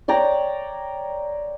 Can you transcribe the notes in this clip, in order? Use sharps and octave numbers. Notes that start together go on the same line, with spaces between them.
C#5 D5 G5 A#5